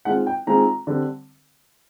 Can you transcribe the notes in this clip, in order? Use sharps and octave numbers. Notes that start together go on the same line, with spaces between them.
D#3 G#3 C4 F4 F#5
G5
D#3 G#3 C4 F4 A#5
D3 G3 C4